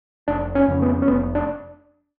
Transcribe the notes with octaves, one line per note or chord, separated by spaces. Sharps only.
F1 D4
C#4
F2 C#3
B3
C#4
F1 B3
D4